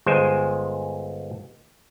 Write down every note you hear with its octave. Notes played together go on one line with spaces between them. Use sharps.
G1 G#3 C5 G5 G#5